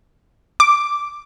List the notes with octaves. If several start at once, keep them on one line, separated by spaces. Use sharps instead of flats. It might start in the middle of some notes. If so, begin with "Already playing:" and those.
D6